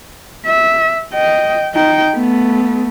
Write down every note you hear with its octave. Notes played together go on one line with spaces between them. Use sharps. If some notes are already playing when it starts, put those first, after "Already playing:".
E5
D#5 G5
D#4 G5
A3 B3